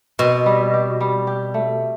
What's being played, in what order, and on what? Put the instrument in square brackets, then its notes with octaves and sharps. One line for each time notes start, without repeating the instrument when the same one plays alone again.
[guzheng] B2 [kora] C4
[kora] G3
G4
G3
G4
A3